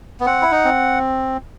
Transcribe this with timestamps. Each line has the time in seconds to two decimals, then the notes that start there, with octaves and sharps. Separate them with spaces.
0.20 B3
0.26 C4 F#5
0.42 E4
0.52 D#4
0.65 C4